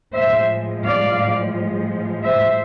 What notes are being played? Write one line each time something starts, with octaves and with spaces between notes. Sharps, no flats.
A2 F3 G#3 C5 E5
D5 F5
C5 E5